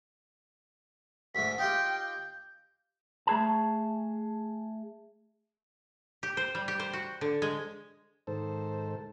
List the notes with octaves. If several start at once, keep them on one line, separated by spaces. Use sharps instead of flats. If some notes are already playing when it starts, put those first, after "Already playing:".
D2 G#2 A3 B6
D#4 F4 G4 G5
G6
A3 G#4 A5
G4
C5
G3
G4
C5
F#4
D3
G#3
G#2 D#3 A4 C5